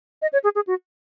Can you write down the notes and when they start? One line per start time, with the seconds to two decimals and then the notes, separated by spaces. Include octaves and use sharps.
0.22 D#5
0.33 C#5
0.44 G#4
0.55 G#4
0.67 F#4